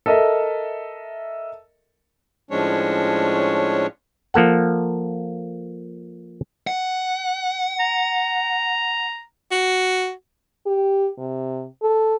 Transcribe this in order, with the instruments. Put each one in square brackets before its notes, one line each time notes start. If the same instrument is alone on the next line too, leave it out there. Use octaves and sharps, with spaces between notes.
[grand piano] A4 A#4 D#5 E5
[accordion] A2 F3 G#3 C#4 D4 C#5
[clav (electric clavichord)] F3 A#3 A4 F#5
[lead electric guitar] F#5
[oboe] A#5
[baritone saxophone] F#4
[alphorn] G4
C3
A4